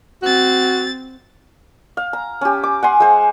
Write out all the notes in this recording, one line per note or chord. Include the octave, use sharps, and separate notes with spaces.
C4 F#4 A6
F5
A#5
C#4 G4
D6
F#5 G#5 C6
G#3 C5